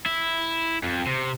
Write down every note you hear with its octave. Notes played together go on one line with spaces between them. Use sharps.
E4
F2
C3